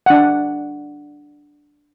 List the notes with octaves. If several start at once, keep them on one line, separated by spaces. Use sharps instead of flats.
D4 F#5